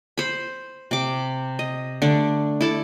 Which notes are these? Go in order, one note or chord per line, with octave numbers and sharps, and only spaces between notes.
C5 B5
C3 D6
D#5
D3 A3 D4
E4 A4 D5